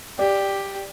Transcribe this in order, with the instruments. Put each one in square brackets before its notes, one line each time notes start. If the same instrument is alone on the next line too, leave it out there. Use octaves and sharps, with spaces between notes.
[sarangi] G4 [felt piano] D5